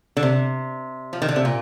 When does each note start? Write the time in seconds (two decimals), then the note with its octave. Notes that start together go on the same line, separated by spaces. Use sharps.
0.17 D3
0.23 C3
1.13 F3
1.22 D#3
1.29 D3
1.36 C3
1.45 A#2